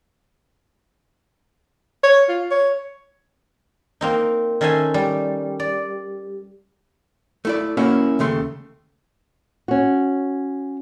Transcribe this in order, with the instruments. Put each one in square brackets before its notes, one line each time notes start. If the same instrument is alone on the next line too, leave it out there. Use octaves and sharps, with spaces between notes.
[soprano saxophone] C#5
F4
C#5
[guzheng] A#3 C4 D#4
D#3 C#4 A4 C5 E5 G#5
G3
D5
[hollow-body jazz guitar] A3 E4 D5
A#3 C#4 E4 F#4
D#2 C#3 A3 C6
[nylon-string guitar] C#4 F#4